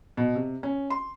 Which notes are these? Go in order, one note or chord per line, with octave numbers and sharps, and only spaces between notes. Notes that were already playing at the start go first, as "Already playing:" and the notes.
B2
C3
C#4
C6